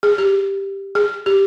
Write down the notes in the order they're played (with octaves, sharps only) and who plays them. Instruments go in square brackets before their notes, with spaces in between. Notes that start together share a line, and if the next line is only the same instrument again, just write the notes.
[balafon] G#4
G4
G#4
G4